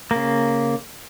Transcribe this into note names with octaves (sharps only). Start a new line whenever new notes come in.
C#3 A#3